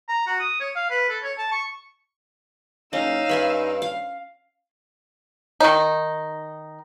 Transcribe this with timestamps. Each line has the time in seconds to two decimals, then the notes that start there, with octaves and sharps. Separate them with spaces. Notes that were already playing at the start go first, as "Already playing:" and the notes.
0.08 A#5
0.27 F#4
0.40 D#6
0.60 C#5
0.75 F5
0.90 B4
1.09 A4
1.23 C#5
1.38 A5
1.52 C#6
2.93 F#1 C#4 D#4 F5 E6
3.29 G2 E5 G#5 B5
3.82 F5
5.60 D#3 D#4